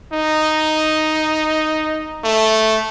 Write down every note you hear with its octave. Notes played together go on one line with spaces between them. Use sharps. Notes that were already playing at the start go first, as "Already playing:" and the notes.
D#4
A3